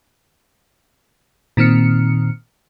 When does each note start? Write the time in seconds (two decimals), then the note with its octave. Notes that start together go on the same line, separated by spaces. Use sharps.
1.57 A#2 D#3 C4 F6 C#7